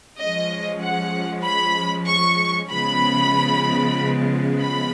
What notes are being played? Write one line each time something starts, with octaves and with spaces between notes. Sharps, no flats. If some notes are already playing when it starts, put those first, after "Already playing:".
F3 G#3 C#4 D#5
F#5
B5
C#6
C#3 F3 G#3 B3 B5
B5